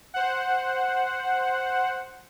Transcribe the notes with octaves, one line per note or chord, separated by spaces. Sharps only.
C5 F#5